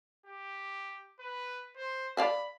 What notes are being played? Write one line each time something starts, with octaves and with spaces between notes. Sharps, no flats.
G4
B4
C5
D5 F5 A5 B5